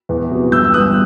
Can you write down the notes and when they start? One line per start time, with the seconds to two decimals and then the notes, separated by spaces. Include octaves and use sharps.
0.09 E2
0.31 C3 F#3 B3
0.52 G1 E6 G6
0.64 E6
0.73 G2 E3 B3 D#6 F#6